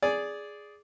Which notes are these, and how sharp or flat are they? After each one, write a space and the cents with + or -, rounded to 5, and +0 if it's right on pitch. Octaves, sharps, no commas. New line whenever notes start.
G#4 +0 D5 -10